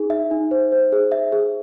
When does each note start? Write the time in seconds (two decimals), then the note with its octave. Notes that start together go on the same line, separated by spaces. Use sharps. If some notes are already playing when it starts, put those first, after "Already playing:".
Already playing: D#4 G#4
0.10 E5
0.31 D#4
0.51 C5
0.72 C5
0.92 G#4
1.12 E5
1.32 G#4